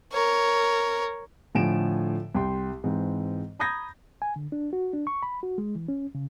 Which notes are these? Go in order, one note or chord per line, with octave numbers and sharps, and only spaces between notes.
A#4 C#5
A2 D3 F3 G#5 D7 E7
C2 G5 C6
G#2 E3 C4
A#5 B5 D#6 G6 G#6 A#6
G#5
D3
D4
F#4
D4
C#6
B5
F#4
G#3
E3
C#4
C#3